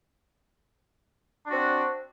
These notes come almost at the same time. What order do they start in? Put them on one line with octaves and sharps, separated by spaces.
D4 F#4 C4